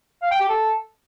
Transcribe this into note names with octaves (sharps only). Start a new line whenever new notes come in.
F5
G5
G4
A4